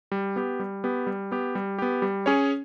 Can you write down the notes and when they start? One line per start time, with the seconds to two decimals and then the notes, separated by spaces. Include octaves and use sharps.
0.12 G3
0.36 B3 G4
0.60 G3
0.84 B3 G4
1.07 G3
1.32 B3 G4
1.55 G3
1.79 B3 G4
2.02 G3
2.26 C#4 G#4 C#5